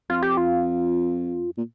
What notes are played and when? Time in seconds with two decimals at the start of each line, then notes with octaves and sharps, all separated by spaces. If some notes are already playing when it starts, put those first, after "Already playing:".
0.10 F2 F4
0.23 G4
0.37 F4
1.57 A#2